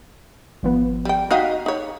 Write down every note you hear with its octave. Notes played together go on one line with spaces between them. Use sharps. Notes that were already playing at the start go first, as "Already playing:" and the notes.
G#1 F3 B3
G3 G5
D#4 F#4 D#5 F5 G5 B6
D#4 C#5